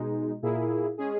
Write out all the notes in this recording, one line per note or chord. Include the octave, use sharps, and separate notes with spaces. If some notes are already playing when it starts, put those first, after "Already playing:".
Already playing: B2 G#3 D#4
A#2 A#3 E4 G#4
G#3 C#4 G#4